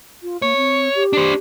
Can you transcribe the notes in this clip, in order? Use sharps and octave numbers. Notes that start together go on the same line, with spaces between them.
F4
A#3 C#5
C4
G4
D4 C5